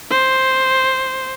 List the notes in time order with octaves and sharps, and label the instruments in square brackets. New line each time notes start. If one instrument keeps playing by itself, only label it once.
[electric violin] C5